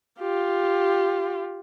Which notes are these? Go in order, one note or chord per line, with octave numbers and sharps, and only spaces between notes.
F4 G4